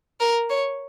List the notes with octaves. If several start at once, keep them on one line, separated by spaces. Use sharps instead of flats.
A#4
C#5